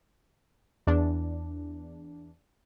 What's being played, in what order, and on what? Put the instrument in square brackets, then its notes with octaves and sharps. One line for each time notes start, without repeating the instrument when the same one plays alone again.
[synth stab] E2 D4